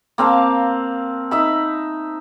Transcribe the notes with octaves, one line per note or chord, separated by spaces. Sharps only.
A#3 C4 F5 A5
D#4 E5 B5